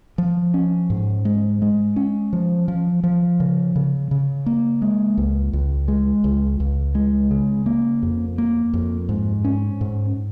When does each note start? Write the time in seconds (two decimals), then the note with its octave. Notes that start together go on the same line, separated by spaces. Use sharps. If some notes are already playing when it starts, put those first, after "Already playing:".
0.18 F3
0.54 C#4
0.90 G#2
1.25 G#3
1.62 G#3
1.96 C#4
2.33 F3
2.68 F3
3.04 F3
3.40 C#3
3.76 C#3
4.11 C#3
4.46 A#3
4.82 G#3
5.17 C#2
5.53 C#2
5.88 G#3
6.24 C#2
6.60 C#2
6.95 G#3
7.31 C#3
7.66 A#3
8.03 F2
8.38 A#3
8.74 F2
9.09 G#2
9.45 C#4
9.81 G#2